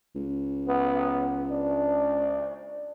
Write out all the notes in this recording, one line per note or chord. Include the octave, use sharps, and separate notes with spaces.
C#2
B3
D4